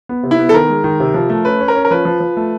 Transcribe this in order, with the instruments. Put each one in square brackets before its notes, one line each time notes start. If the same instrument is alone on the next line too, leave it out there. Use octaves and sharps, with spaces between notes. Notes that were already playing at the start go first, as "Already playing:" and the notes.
[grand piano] B3
C3
[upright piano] E4
[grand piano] B3
[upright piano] A4
[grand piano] D#3 [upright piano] A#4
[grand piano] G#3
D#3
C3
F3
A3
[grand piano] C#4 [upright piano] B4
[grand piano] C#4
[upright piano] A#4
[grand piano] C#4
[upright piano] A#4
[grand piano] F3 [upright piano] B4
[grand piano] F3
F3
A3